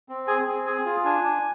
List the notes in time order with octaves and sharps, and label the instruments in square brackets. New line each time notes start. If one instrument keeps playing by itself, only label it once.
[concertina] C4
G#4 G#5
C4
G#4 G#5
F4
D4 G#5
D4